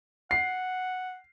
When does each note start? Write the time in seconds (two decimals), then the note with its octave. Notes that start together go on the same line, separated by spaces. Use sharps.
0.31 F#5 C7